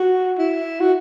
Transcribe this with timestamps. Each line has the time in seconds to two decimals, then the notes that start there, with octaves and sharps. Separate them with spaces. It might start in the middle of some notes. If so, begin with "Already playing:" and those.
Already playing: F#4
0.38 E4
0.80 F#4